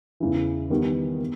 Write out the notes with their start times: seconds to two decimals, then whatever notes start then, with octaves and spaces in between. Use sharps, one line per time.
0.20 E2 C#3 E3
0.70 D#3 G3 B3
1.20 B3